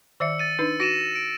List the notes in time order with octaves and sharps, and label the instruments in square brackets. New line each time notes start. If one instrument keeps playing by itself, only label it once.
[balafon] D#3 D5 E5 [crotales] E6 C#7
[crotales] A6 D#7
[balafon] D4 D#4 B4 [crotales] E6
[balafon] F#4 [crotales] A#6 D#7 E7
[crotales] D7